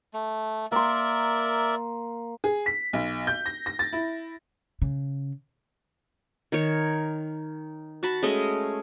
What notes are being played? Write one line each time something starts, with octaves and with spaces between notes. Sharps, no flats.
A3
A#3 A#4 D5 E5 C6
G#4
B6
B1
G6
A#6
A#6
A6
E4
C#3
D#3 A#4 C#5
F#4 A5 B5
G#3 A3 C#4 D#5